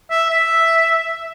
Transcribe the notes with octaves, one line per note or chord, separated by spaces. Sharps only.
E5
E5